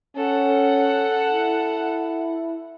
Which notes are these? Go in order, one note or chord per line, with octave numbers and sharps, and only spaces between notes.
C#4 A4 F#5
E4